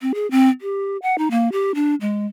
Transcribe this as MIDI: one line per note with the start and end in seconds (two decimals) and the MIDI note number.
0.02 0.12 60
0.15 0.29 68
0.31 0.49 60
0.61 0.97 67
1.02 1.18 78
1.18 1.28 63
1.31 1.49 58
1.52 1.72 67
1.75 1.95 62
2.01 2.26 56